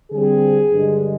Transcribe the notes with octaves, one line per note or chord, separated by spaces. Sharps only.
D3 G3 C4 G#4
G2 D3 G#3